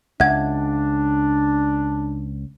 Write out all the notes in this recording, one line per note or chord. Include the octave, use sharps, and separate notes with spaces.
C#2 D4 E5 F#5 G#6